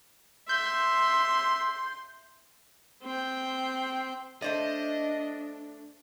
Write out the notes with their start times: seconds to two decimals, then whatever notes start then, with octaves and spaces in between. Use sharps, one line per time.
0.49 E5 C6 G6
3.03 C4 G5
4.42 A3 D4 C5 D5 D#5